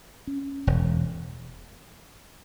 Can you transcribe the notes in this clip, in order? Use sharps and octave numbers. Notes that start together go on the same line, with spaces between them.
C#4
E1